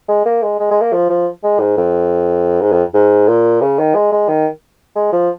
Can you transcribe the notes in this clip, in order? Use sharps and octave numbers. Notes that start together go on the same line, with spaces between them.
G#3
A#3
G#3
G#3
G#3
A#3
F3
F3
G#3
G#2
F2
G#2
F2
G#2
A#2
C#3
D#3
G#3
G#3
D#3
G#3
F3